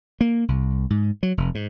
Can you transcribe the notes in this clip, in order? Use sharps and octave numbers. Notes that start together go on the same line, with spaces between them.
A#3
C2
G#2
F#3
F1
G#2